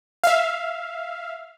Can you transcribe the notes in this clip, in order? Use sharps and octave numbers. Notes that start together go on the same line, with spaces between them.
E5 F5